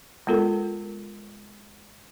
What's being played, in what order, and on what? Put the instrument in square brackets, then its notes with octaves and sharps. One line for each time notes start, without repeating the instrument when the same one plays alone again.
[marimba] G#3 B3 F4 A4 A#4